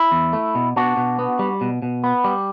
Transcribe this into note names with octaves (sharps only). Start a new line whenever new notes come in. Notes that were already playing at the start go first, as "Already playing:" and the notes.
Already playing: E4
E2
A3
B2
B2 D4 F#4
B2
B3
G3
B2
B2
B3
G3